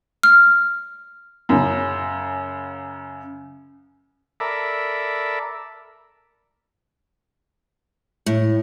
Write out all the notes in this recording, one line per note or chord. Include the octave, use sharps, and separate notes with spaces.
F6
F#2 C#3
A4 A#4 D5 E5 B5
A2